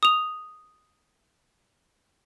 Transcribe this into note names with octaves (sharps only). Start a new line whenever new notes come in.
D#6 F7